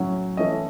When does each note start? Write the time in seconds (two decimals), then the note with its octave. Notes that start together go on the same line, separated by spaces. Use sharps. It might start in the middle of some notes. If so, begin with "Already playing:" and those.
Already playing: A2 F#3 C#4
0.37 E3 A3 C#4 D#5